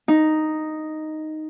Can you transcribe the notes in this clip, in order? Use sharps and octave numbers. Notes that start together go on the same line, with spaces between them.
D#4